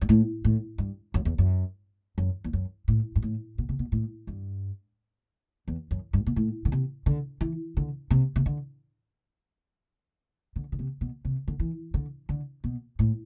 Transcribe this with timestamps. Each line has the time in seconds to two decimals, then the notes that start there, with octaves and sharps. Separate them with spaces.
0.02 G2
0.09 A2
0.45 A2
0.78 G2
1.14 F#2
1.25 E2
1.38 F#2
2.18 F#2
2.44 E2
2.53 F#2
2.88 A2
3.16 G2
3.23 A2
3.58 B2
3.69 C3
3.79 B2
3.92 A2
4.27 G2
5.68 E2
5.91 F#2
6.13 G2
6.27 B2
6.36 A2
6.65 D3
6.72 C3
7.06 D3
7.41 E3
7.77 D3
8.11 C3
8.36 C3
8.46 D3
10.56 D3
10.72 D3
10.79 C3
11.01 B2
11.25 C3
11.48 D3
11.60 E3
11.94 D3
12.29 D3
12.64 B2
12.99 A2